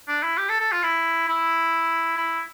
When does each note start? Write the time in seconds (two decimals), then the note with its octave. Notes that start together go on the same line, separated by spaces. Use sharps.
0.08 D4
0.23 E4
0.38 G4
0.49 A4
0.60 A4
0.72 F4
0.83 E4
1.28 E4
2.17 E4